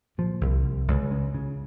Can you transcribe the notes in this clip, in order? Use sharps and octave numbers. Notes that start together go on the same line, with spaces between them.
A#2 F3
C2
C2
C#2
C#3
C#3